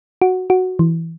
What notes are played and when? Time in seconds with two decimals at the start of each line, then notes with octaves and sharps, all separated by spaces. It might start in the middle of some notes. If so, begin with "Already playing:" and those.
0.22 F#4
0.50 F#4
0.79 E3